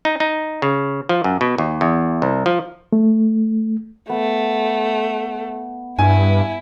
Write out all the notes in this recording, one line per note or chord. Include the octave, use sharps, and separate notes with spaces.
D#4
D#4
C#3
F3
F#2
B2
D#2
E2
C2
F3
A3
A3 B3
G2 E4 G#5